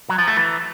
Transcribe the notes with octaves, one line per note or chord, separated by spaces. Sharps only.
F#3
F3
A3
E3